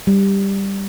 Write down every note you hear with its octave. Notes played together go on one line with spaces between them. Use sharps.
G3